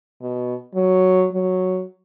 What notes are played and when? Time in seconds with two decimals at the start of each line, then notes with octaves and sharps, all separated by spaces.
0.22 B2
0.75 F#3
1.32 F#3